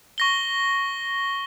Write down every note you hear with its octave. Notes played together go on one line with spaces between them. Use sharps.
C#6 A#6 G7